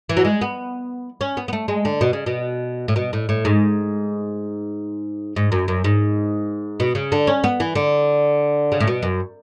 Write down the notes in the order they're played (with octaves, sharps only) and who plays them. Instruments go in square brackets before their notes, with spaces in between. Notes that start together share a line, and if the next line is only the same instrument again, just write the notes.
[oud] E3
F#3
G#3
B3
C#4
B3
B3
A3
G#3
D3
B2
C#3
B2
A2
B2
A2
A2
G#2
G#2
F#2
F#2
G#2
B2
C#3
D3
C#4
B3
E3
D3
C#3
A2
B2
F#2